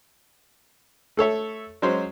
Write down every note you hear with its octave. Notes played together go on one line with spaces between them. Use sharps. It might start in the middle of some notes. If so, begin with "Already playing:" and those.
A3 A4 C#5 E5
F#3 G#3 C#4 C5